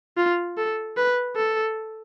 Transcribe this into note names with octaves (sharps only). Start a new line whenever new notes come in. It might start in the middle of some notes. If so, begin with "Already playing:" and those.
F4
A4
B4
A4